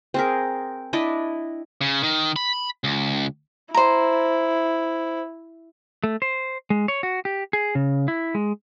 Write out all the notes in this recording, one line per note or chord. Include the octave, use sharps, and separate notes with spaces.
C4 G#4 A#4
D4 E4 D5 D#5
C#3
D#3
B5
C#2
E4 C5 A#5
A3
C5
G#3
C#5
F#4
G4
G#4
C#3
E4
G#3